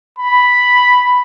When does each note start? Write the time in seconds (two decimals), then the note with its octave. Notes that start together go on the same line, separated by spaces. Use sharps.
0.19 B5